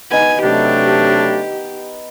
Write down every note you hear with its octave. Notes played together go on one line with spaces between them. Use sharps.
B3 D#4 G#5
C3 F#3 A3 D4 G4